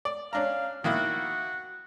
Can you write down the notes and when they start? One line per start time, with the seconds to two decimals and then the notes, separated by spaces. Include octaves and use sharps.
0.05 D5
0.33 C#4 D4 F5 A#5
0.84 D#3 A#3 E4 F#4